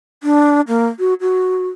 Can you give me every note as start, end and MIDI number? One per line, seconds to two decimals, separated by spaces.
0.23 0.61 62
0.68 0.87 58
0.99 1.14 66
1.21 1.68 66